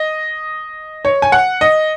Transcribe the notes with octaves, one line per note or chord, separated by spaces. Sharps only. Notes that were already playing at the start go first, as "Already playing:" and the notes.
Already playing: D#5
C#5
G#5
F#5
D#5